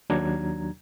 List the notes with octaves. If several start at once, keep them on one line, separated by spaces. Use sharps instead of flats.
D#2 F#3 D4 A#5 G#6